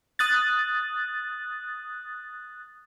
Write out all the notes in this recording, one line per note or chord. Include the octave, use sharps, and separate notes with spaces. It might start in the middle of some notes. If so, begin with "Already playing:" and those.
D#6 F#6 A6